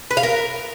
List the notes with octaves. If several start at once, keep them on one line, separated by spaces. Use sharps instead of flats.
B4
F5
A#4